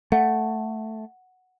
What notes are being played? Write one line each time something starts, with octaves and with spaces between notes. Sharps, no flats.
A3 F#5